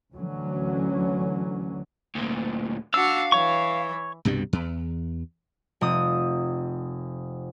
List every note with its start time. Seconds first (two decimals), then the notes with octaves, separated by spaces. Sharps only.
0.14 D2 D3 E3 F#3 C#4
2.15 D2 A#2
2.94 D4 F#4 F5 E6
3.32 E3 C#5 C#6
4.25 C2 G2 B2 G3
4.53 E2
5.81 F1 D#6